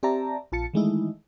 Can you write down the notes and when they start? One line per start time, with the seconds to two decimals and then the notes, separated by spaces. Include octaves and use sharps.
0.03 C4 G4 D5 E5 A5 A#5
0.52 A#1 F4 A5 C#7
0.74 D#3 E3 G#3 A3 D#4 E4